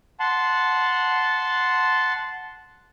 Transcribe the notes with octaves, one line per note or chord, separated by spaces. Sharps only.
F#5 A5 C6